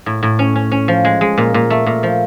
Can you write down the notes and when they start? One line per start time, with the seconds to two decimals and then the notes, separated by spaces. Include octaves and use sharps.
0.06 A2
0.23 A2
0.39 C#4
0.56 C#4
0.72 C#4
0.88 F3
1.05 G#3
1.21 G#3
1.38 A#2
1.54 A#2
1.70 A3
1.86 A#2
2.03 F3